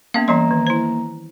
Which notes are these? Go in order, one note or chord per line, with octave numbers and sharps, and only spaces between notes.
A#3 B3 C#4 F5
E3 G3 A#3 A#5 C6
D#3
E4 C5